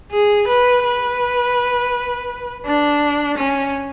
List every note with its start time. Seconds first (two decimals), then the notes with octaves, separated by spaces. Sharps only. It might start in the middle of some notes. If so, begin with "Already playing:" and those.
0.11 G#4
0.48 B4
0.84 B4
2.66 D4
3.38 C#4